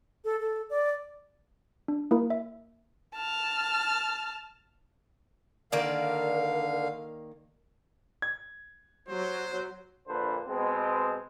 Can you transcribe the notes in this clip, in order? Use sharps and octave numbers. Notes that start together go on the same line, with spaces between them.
A4
A4
D5
D4
A#3 E4 A#4
E5
A5 F6
D3 D#3 A#3 A#4 D5 F5
G#6
F#3 C5
A#1 A#2 D3 B4 C5
B2 G#3 B3 C4